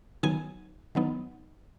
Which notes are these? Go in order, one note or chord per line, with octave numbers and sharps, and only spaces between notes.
D#3 F#3 B3 D#4 G#5
D#3 F#3 B3 D#4